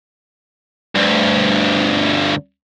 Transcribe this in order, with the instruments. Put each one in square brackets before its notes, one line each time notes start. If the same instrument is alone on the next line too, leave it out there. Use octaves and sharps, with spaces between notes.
[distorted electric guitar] D2 G2